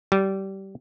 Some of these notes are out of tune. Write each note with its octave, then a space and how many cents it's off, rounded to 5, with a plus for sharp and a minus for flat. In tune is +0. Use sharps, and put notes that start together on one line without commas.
G3 -20